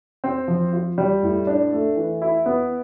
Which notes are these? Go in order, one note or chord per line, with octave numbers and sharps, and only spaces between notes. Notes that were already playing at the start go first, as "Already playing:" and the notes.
C4
F3
F4
G3
A2
D4
A3
E3
E4
B3